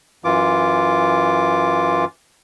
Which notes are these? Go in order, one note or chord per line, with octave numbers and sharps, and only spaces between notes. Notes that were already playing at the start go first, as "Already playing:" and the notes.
F#2 E3 F4 D6